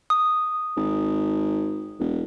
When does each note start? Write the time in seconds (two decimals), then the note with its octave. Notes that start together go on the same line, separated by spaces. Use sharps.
0.10 D#6
0.77 G#1
1.99 E1